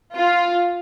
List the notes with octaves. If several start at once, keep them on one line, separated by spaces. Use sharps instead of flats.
F4